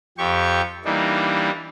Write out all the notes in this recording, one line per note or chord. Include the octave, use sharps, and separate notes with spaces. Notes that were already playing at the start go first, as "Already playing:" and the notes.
F2 G4 C#6
E3 G3 A#3 D4 D#4